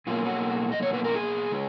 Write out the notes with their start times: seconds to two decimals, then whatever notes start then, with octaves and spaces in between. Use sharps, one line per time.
0.07 B2 F#3 A#3 F4
0.25 F#4
0.72 D#5
0.82 C#5
0.93 B4
1.04 A#4
1.15 G#4
1.51 C#3 G#3